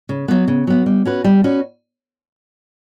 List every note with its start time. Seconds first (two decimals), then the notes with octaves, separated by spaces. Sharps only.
0.09 C#3
0.28 F#3 B3
0.48 C#3
0.67 F#3 B3
0.86 G3
1.05 C#4 F#4 B4
1.24 G3
1.44 C#4 F#4 B4